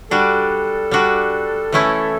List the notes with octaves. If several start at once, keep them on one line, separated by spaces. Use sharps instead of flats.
G3 D4 F#4 A4
G3 D4 F#4
E3 A3 C#4 E4